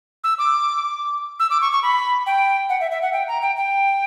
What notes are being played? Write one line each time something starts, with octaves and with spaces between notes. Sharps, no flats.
E6
D6
E6
D6
C#6
C#6
B5
G5
F#5
E5
E5
F#5
G5
A#5
G5
G5